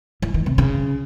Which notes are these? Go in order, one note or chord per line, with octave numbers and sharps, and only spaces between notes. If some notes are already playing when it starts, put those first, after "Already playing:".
E3
D#3
C3
C#3